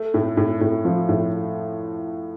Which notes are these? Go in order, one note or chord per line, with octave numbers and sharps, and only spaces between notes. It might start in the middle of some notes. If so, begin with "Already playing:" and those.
Already playing: A3
A2
A2
A2
F3
A2